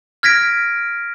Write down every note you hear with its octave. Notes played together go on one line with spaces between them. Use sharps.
F6 G#6 A#6 B6 D7